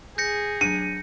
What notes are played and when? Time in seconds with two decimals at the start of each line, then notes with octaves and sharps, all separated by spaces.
0.18 G#4 G6 A#6 C#7
0.61 F#3 D4 C#7 D#7